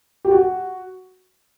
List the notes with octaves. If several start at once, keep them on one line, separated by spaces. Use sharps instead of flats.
G4
F#4